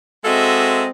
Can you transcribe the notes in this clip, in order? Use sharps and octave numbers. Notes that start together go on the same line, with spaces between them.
G#3 C4 F#4 A4 D#5 E5